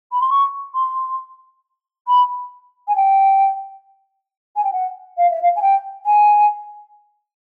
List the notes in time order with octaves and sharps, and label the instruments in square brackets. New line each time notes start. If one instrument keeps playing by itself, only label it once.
[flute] B5
C6
C#6
C6
B5
G#5
G5
G#5
G5
F#5
F5
E5
F5
G#5
G5
G#5